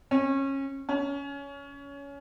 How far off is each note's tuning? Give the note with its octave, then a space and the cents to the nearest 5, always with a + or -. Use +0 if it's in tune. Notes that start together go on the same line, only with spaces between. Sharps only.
C#4 -25
C#4 +20